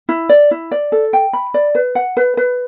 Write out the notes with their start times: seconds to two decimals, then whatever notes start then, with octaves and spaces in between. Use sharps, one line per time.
0.09 E4
0.29 D5
0.51 E4
0.71 D5
0.92 A4
1.13 G5
1.33 B5
1.54 D5
1.75 B4
1.95 F#5
2.17 B4
2.37 B4